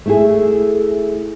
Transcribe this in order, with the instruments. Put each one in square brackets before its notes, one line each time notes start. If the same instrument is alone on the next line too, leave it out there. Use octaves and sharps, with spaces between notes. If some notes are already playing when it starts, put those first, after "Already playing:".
[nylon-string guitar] A3 E4 G#4